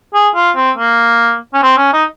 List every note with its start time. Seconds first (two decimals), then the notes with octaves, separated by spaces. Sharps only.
0.14 G#4
0.35 F4
0.56 C4
0.78 A#3
1.54 C#4
1.63 C4
1.77 C#4
1.93 D#4